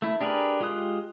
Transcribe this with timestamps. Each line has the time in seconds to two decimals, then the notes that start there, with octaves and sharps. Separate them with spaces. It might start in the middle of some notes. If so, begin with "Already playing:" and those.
0.02 A3 E4
0.21 D4 G4 G#4 A#4 B4
0.60 G#3 F4 G4 D#6 F#6